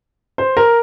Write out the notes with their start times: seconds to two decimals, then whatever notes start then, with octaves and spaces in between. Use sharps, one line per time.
0.38 C5
0.57 A#4